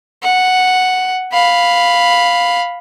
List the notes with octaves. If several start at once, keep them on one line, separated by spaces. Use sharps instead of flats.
F#5
F5 B5